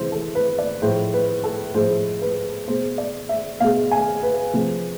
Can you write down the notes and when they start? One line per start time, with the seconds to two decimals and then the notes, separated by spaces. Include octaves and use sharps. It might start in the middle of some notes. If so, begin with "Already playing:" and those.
Already playing: C3 E3 G#3 C5
0.12 A4
0.35 B4
0.59 D5
0.82 A2 F3 G#3 C5
1.13 B4
1.44 A4
1.74 A2 F3 G#3 C5
2.22 B4
2.67 B2 G#3 C5
2.98 D5
3.29 E5
3.60 B2 G#3 F5
3.91 G#5
4.23 B4
4.53 C3 F3 G#3